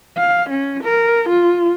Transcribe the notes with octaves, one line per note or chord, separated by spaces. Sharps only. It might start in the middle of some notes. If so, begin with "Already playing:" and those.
F5
C#4
A#4
F4